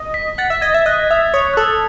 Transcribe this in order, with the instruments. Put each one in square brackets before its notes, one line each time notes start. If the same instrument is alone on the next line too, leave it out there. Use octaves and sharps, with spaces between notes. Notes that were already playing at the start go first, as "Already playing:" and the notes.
Already playing: [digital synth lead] D#5
[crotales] B6
[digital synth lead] F#5 [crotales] A6
[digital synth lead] E5
[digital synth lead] D#5 [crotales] G#6
[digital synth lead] E5
[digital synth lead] D#5 [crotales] F#6
[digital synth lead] E5 [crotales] D#6
[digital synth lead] C#5 [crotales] D#6
[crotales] F#6
[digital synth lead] A4 [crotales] E6